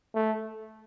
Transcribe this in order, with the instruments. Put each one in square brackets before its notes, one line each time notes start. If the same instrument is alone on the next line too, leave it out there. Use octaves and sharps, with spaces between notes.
[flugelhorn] A3